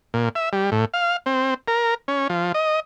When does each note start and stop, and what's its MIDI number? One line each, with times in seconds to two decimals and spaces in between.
0.14 0.29 46
0.35 0.49 76
0.53 0.70 55
0.72 0.85 45
0.94 1.17 77
1.26 1.54 60
1.68 1.94 70
2.08 2.28 61
2.30 2.52 53
2.54 2.80 75